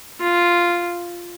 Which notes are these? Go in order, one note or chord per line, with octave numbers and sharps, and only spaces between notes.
F4